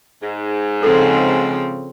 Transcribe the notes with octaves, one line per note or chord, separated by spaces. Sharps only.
G#2
C#3 F3 C4 A4